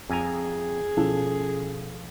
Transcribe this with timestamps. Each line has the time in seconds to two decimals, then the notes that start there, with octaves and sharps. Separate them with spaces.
0.10 F2 G#4 G#5 A#5
0.97 B2 F3 C#4 A4